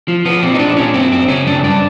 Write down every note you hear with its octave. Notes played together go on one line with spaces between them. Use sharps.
F3
F3 B3
A#2 C4
D#4
A#2 D4
A#2 C#4
F#2 C4
F#2 C4
C#3 C#4
F#2 D4
G2 D4